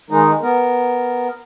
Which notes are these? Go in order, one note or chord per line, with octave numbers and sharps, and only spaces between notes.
D#3 G#3 D#4
B3 A#4